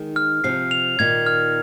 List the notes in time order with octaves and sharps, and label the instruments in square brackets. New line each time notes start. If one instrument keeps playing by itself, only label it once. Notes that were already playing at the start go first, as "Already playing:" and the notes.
Already playing: [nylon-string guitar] D#3 G#3
[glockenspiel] F6
[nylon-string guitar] C3 F3 [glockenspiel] C7
[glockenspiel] F7
[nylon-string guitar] A#2 D#3 [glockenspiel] G#6
[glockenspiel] F6